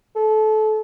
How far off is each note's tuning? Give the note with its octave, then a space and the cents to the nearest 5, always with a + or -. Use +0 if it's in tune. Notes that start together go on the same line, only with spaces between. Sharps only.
A4 -25